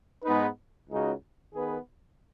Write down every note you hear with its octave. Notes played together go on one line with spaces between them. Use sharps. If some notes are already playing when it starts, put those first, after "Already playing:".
G#2 G#3 B3 D#4 B4
C#2 C#3 G#3 D#4 F#4
D#3 B3 G#4 B4